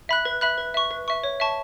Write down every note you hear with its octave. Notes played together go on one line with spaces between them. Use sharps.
E5 B5 F#6
B4
E5 B5 F#6
B4
E5 C#6
B4
E5 C#6
C#5
E5 A5 C#6